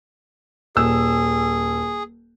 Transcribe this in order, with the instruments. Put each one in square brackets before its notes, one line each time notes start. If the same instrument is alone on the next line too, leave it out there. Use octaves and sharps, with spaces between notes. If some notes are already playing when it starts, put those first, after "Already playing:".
[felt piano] D#1 E6 [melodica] G#4